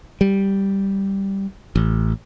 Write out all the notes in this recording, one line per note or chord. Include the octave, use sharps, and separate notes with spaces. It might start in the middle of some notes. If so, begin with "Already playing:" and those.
G3
A1